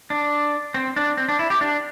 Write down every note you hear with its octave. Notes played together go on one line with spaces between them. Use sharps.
D4
C4
D4
C4
D4
E4
G4
D4